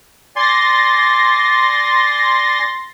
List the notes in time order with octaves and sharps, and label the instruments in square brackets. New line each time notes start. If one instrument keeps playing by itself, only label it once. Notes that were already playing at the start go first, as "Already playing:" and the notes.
[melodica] D5 G#5 [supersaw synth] C6 A6 A#6